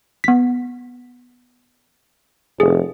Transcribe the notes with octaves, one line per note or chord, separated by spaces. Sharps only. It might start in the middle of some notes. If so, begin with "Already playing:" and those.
B3 B6
F1 G#4